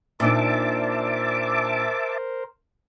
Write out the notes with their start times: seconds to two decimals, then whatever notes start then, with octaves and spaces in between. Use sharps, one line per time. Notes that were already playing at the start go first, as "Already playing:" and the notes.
0.20 A#2 D4 D#4 A#4 C5 E5 A5 D6